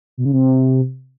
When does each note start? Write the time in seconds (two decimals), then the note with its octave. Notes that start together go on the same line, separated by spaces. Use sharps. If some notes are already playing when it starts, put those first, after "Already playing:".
0.17 B2
0.25 C#3
0.33 C3